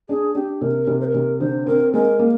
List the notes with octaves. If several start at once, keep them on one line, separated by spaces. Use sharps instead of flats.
D4 G#4
D4 G4
C3 A#4
C3
C5
A#4
C3
D3 C5
C4 A#4
G#3 A#4
A#3 A#4